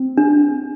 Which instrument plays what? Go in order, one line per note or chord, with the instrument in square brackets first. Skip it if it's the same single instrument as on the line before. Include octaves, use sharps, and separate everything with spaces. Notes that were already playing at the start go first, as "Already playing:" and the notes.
Already playing: [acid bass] C4
[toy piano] D4